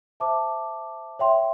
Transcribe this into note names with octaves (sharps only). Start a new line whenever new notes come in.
C5 E5 A5 D6
C#5 E5 G5 C6